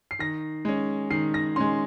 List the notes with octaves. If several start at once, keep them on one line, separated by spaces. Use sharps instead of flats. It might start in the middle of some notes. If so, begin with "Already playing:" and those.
C7
D#3 A#6
G#3 C#4
D#3 C7
A#6
G#3 C#4 C6